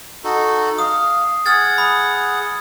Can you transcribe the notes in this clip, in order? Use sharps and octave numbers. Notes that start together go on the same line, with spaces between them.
D#4 F#4 A4
F5 D#6
G#4 F#5 F6 G#6 A6
B5